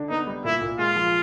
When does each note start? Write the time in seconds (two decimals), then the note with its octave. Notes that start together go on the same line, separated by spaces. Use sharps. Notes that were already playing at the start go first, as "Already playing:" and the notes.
Already playing: D3 D4
0.09 B3 D#4
0.27 G3
0.45 A#2 E4
0.61 A#2
0.79 G#3 F4
0.96 F3